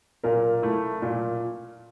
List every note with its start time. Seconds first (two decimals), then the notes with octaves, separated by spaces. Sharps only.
0.24 A#2 A#4
0.62 A3 E4
1.02 A#2